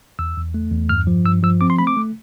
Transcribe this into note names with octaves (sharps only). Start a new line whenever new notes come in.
E2 E6
E2
A3
E2
G2 F6
F3
G2 E6
F3 E6
C4 D6
C6
A3 B5
D6
A3